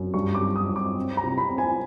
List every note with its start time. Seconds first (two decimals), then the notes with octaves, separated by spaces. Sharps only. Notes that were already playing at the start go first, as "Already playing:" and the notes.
Already playing: F#2
0.14 G2 C#6
0.35 D6
0.41 G3
0.56 D#6
0.69 G2
0.76 D6
0.96 C4
1.17 A#5
1.24 C3
1.38 B5
1.51 C4
1.58 G#5